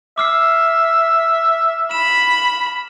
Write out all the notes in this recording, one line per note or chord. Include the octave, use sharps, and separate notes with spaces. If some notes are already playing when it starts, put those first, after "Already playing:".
E5 D6 F6 C7
B5 E7